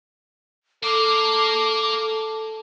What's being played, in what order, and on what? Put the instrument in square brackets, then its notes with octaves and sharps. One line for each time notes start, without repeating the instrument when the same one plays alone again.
[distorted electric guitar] A#3 F5 [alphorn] A4 [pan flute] D6